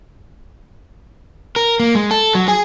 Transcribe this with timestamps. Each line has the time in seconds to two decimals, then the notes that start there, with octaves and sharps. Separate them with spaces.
1.56 A#4
1.80 A#3
1.95 G#3
2.11 A4
2.35 F#3
2.48 G#4 G#5